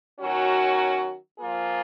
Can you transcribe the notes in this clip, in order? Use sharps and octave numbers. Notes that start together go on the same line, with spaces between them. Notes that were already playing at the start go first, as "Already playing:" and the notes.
D#3 F#3 C#4 F#4
F3 A#3 F4 G#4